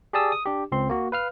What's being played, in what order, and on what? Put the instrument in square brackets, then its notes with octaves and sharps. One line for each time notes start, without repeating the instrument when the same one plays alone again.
[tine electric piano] G4 G#4 D5 A5 D#6 E6
D#6
D4 G4
C#2 C4 C6
A#3 F#4
B4 F5 F6